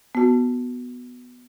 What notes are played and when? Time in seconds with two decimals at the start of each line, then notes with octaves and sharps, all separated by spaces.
0.15 B3 F#4